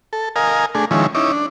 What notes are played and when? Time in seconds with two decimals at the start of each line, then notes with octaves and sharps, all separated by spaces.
0.13 A4
0.36 A#4 D#5 F5 G#5
0.75 A3 D4 G#4
0.91 D#3 F3 G#3 C#4 E4
1.15 C#4 D#4 E4 D6
1.32 D4